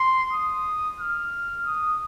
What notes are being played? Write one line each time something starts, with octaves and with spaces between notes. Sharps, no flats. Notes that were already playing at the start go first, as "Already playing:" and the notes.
Already playing: C6
D#6
F6
D#6